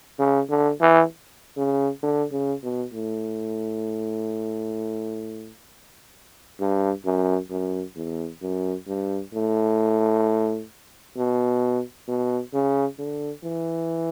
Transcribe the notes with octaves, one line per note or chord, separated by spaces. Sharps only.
C#3
D3
E3
C#3
D3
C#3
B2
A2
G2
F#2
F#2
E2
F#2
G2
A2
B2
B2
C#3
D3
E3